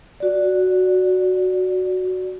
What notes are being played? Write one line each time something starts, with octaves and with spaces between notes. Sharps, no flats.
F#4 D5